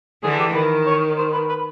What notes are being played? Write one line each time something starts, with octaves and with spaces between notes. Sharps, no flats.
D3 E3 G#4
G4
D#3 B4
C#5
C5
B4
B4